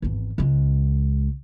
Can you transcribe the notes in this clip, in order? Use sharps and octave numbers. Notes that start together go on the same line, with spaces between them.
G#1 E2
C#2 G#3